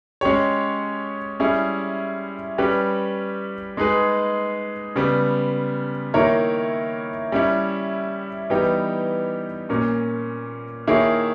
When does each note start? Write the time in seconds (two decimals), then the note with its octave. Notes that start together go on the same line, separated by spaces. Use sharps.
0.21 G#3 C#4 G4 C#5
1.40 G3 C#4 E4 G#4
2.58 G3 C#4 G4 B4
3.77 G#3 D#4 G#4 B4
4.95 C#3 G3 B3
6.14 D#3 A#3 E4 A#4 C#5
7.32 G3 C#4 E4
8.50 E3 G3 B3 D#4 G4
9.69 A#2 A#3 C#4
10.87 D#3 A#3 E4 G#4 C#5